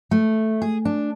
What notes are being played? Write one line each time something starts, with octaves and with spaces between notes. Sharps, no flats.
A3
G#4
D4